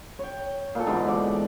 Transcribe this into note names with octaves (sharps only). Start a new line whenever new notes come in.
C#5 G5
A#2 A4
G#2 B2 D3 E3
D5